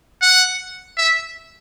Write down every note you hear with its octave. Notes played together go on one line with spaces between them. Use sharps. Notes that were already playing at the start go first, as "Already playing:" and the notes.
F#5
E5